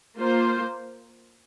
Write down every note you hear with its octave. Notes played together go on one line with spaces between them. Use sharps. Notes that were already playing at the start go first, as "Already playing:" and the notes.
A#3 F4 C5